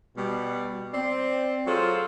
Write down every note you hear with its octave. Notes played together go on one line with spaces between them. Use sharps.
B2 G3
C4 D5
F#3 F4 G#4 A4 C5